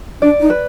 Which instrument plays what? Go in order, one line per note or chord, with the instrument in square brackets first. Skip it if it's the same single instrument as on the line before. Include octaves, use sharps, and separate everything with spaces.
[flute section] D4 [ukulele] D5
[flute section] D#4
[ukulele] B4